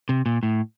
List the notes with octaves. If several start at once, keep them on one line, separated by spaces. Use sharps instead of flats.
C3
A#2
A2